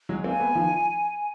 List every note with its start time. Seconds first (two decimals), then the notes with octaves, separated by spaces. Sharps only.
0.09 F#3 G#3
0.24 A#3 C4 G#5
0.40 A3 B3
0.55 D#3 F3